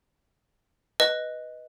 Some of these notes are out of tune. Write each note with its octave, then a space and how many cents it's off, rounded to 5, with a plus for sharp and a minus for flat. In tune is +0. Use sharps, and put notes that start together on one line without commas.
B4 +0 D#5 +0